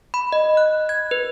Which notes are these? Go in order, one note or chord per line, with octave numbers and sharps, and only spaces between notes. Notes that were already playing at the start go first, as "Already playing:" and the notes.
B5
D#5
F#6
G#6
B4